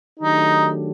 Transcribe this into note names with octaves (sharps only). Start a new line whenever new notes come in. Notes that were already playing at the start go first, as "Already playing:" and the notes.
D#3 F#3 A3 D4 D#4 G4